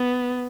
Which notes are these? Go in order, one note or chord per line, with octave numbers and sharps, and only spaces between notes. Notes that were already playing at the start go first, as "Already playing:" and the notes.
Already playing: B3